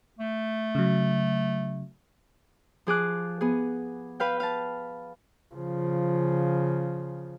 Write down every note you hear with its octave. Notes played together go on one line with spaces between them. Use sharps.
A3
C#3 F#3
F3 G#4 D6 F#6
B3 G#4
B4 F5 G5
F5 A5
C#3 F3